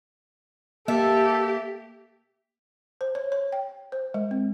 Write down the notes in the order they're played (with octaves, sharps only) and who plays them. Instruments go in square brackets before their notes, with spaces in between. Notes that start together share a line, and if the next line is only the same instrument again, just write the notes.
[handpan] A#3 [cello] G4 [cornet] A4 [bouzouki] E5
[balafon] C5
C#5
C#5
G5
C5
G#3
C4